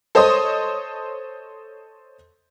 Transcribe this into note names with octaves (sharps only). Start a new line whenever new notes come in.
A4 C5 C#5 D#5 C6 D#6